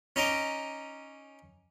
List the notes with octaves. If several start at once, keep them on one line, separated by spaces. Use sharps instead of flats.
C#4 D#4 A#5 C6 D6